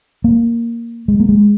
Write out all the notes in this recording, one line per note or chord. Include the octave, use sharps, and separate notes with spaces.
A#3
G#3
A#3
G#3